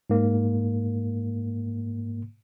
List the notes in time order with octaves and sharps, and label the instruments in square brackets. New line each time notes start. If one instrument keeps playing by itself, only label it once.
[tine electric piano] G#2 A#3